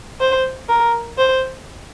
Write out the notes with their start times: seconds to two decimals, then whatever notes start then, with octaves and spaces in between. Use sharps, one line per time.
0.21 C5
0.69 A#4
1.18 C5